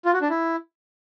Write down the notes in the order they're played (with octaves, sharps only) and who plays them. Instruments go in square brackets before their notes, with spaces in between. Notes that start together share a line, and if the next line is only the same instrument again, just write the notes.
[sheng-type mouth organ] F4
F#4
D4
E4